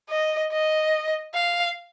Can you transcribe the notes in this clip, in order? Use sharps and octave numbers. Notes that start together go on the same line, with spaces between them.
D#5
D#5
F5